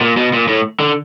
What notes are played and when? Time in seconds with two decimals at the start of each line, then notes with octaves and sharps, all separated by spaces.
0.01 A#2
0.17 B2
0.33 A#2
0.48 A2
0.80 D3